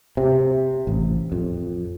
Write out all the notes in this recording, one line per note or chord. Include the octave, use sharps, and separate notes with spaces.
C3
A1
F2